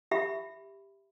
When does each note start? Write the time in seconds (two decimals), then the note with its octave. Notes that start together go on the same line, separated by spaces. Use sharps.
0.11 G4 E5 B5